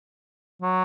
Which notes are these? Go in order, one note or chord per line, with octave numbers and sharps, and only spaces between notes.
F#3